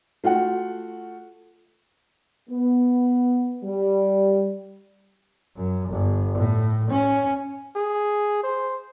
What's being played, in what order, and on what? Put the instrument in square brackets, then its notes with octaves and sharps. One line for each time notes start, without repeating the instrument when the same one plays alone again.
[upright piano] A3 F4 F#4 F#5
[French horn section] B3
G3
[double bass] F#2
G1
A2
C#4
[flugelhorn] G#4
C5